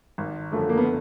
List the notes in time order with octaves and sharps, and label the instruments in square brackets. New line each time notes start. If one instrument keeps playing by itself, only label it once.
[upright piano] G#1
F#2 D3 F3 A3
[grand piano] A#3
B3